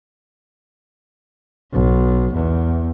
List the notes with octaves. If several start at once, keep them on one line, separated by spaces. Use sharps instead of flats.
B1
E2